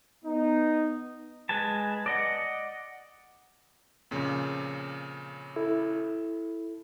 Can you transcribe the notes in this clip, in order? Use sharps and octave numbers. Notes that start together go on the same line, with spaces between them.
B3 D#4
G#3 B4 G#5 A5
D5 D#5 F#5
F2 A#2 C#3
E4 A4